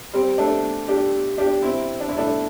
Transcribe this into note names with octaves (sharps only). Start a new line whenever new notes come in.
G3 C4
A3 D4
D4 G4
D4 G4
C4 E4
D4
E4
A3 D4